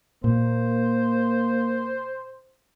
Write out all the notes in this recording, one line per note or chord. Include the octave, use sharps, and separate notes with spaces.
A#2 A#3 C5